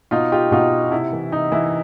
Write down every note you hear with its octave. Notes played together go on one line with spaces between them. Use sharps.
B2 D#4 F4
F4 G4
B2 D#4 F4
C3 E4
E3
C3 D#4
E3 E4